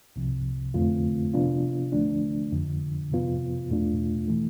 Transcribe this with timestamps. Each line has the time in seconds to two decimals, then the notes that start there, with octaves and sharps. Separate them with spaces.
0.16 C2 C3 F3
0.74 F2 D3 A3 C4 F4
1.34 C3 F3 B3 D4 F4
1.92 D2 D3 F3 A3 D4
2.52 F2 D3 F3
3.11 F2 C3 F3 B3 F4
3.70 E2 B2 A3 D4 F4
4.28 E3 A3